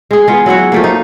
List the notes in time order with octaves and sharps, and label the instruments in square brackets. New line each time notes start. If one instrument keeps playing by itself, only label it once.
[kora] G#3 G#4
G#3 B3 F4
F#3 E4 F#4 F#5
F3 A3 A#3
D#4